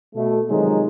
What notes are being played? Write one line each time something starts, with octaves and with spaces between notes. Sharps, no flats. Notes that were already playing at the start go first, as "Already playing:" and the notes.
B2 A3
C3 D#3 F3 F#3 G#3 D#4